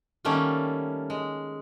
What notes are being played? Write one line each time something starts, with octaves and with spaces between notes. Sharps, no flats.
D#3 G3 A3 A#3 C#4
G#3